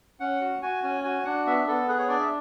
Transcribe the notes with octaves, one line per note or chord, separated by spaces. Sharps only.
C#4 F#5
F#4
F#4 G#5
C#4 G#5
F#4 G#5
D4 F#5
B3 E5
B3 A4
G#4 B4
C#5
D4 D5
E5